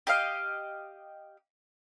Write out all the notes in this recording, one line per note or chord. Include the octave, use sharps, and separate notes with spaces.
G4 D#5 F5